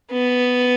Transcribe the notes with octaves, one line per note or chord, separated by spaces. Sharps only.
B3